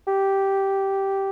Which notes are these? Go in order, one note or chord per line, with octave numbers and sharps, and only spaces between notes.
G4